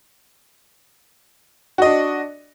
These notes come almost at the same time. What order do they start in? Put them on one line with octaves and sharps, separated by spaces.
F#4 D#5 D4